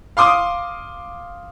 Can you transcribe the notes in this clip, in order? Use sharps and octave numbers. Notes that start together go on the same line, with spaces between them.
F5 C6 D6 D#6